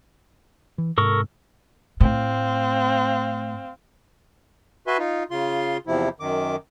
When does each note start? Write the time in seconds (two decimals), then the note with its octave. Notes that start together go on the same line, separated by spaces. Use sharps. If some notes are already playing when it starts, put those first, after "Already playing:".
0.78 E3
0.98 G#2 C3 A4 A#4 C#6
2.00 A2 C4 F5
4.87 F#4 B4 E5 G#5 C6
4.99 D#4 F4
5.31 C#3 F4 C6
5.87 E2 C3 F3 E4
6.20 F#2 D#3 D6